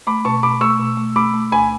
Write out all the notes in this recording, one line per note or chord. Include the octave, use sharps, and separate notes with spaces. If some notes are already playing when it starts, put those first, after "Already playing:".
A3 B5 D6
B2 A5 C#6
B2 B5 D6
A3 C#6 E6
B2
A3
A3 B5 D6
A3
D2 G#5 B5